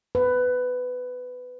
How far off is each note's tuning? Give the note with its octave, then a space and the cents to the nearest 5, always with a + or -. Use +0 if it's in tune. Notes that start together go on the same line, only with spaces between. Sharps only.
B4 +15